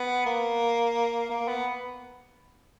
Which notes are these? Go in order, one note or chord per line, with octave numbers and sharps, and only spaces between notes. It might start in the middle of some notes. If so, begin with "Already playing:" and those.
Already playing: B3
A#3
A#3
B3